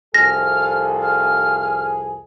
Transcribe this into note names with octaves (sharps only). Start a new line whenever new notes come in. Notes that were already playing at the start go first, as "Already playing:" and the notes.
C2 F2 G#4 A4 F6 A#6
F6